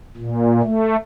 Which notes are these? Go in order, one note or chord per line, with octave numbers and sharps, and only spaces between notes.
A#2
A3